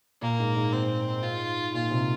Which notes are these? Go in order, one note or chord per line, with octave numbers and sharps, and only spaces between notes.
A#2 A#3
G#2
G#2
C4
F4
A#2 F4
C3